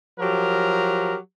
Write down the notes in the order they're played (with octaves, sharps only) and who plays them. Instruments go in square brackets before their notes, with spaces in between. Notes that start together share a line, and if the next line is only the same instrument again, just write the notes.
[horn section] F3 F#3 G4 A#4